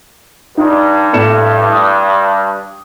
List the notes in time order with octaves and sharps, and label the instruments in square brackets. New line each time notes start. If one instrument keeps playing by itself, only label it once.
[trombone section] G2 [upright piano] D#4
[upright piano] A2 C#7 E7
D#6